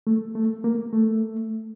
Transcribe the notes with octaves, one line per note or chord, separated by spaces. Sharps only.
A3
A3
A#3
A3